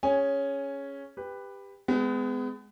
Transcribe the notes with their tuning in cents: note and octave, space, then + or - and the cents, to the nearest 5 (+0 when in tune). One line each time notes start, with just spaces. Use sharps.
C#4 +0 G#4 +0 G#5 +0
G4 +15 B4 +0
G#3 +0 B3 +35